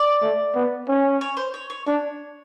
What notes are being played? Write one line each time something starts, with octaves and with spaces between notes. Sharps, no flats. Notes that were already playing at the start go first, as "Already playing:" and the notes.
Already playing: D5
A3
B3
C#4
C#5
C5
C#5
C#5
D4 C#5